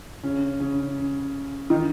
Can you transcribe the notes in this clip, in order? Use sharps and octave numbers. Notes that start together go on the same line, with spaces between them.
C#3 C#4
C#3 C#4
D#3 D#4